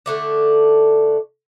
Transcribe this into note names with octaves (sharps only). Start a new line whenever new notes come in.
D3 A3 D4